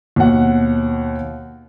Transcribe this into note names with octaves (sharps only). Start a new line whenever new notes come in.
D#2 B2 F#5